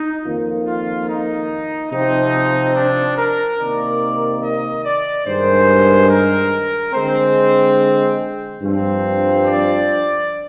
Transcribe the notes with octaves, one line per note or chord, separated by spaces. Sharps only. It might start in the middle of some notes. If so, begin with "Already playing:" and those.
Already playing: D#4
F2 D#3 A#3 F4
F4
D#4
C3 F3 C4 D#4
D4
A#4
C3 D#3 A#3 D5
D#5
D5
G2 D#3 G#3 C5
A#4
D3 G#3 C4 C5
G2 F3 C4
D5